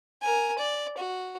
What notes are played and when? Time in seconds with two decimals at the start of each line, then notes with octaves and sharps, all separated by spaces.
0.22 A#4 G#5
0.58 D5
0.97 F#4